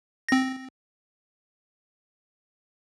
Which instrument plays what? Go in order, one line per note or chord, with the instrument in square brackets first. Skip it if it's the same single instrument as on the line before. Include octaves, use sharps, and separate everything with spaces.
[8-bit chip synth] C4 A#6